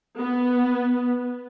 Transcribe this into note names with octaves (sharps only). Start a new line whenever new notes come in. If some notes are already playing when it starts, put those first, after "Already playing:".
B3